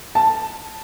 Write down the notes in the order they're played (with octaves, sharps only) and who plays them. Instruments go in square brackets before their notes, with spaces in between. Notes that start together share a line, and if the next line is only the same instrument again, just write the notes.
[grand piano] A5